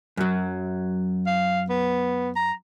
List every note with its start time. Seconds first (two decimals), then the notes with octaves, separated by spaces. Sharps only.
0.17 F#2 F#3
1.27 F5
1.69 B3
2.36 A#5